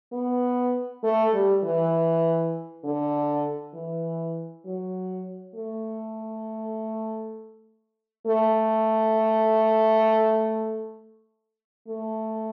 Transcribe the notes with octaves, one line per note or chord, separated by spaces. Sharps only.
B3
A3
G3
E3
D3
E3
F#3
A3
A3
A3